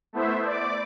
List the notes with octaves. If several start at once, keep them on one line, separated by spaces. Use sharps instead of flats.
A3 B3 E4 C5 E5
D5 D6